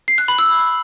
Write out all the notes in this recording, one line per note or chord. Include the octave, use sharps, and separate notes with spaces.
C7
F#6
B5
E6